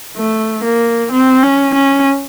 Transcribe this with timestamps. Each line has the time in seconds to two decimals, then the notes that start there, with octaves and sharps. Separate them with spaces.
0.17 A3
0.64 A#3
1.12 C4
1.43 C#4
1.75 C#4